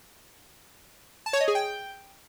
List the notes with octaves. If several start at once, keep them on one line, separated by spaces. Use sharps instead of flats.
A5
C#5
D#5
G#4
G5